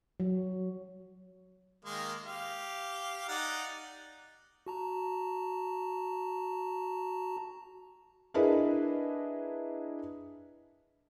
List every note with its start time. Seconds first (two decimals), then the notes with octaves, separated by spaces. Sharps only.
0.20 F#3
1.85 D#3 G#3 A#3
2.25 G4 F5
3.29 D#4 D5 F#5
4.67 F#4 A5 A#5
8.34 D4 E4 G#4 A#4 B4 D#5